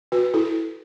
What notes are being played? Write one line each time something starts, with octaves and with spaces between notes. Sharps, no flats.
F#4 B4
E4 A4